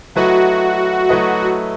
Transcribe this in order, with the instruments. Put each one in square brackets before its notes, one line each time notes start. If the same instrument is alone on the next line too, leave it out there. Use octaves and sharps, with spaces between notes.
[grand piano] F#3 A3 E4 B4 D#5 [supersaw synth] F#4
[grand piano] F#3 A3 E4 B4 D#5